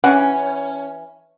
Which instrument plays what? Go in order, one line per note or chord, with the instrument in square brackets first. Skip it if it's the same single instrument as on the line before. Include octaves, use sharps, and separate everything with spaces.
[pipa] E3 [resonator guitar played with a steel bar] C#4 [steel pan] F#5